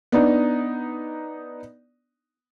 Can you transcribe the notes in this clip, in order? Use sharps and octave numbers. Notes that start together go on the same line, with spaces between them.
B3 D4 D#4